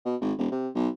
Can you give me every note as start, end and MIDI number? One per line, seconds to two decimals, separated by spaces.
0.05 0.16 47
0.21 0.33 32
0.38 0.49 28
0.52 0.69 48
0.75 0.88 35